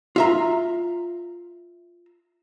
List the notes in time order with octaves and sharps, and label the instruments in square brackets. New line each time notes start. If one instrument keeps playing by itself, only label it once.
[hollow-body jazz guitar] F4 E5 A#5